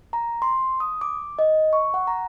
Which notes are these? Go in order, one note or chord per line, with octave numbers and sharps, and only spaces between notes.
A#5
C6
D#6
D6
D#5
C#6
F#5
A#5